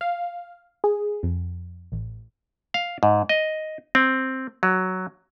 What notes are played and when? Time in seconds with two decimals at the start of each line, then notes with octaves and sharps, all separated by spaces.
0.01 F5
0.84 G#4
1.23 F2
1.92 A1
2.74 F5
3.03 G#2
3.29 D#5
3.95 C4
4.63 F#3